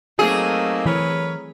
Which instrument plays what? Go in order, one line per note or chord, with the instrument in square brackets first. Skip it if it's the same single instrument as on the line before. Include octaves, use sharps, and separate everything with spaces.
[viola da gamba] F#3 A3 C4 [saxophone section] A#3 D#4 [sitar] G#4
[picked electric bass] E3 [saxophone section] A#4 B4 C#5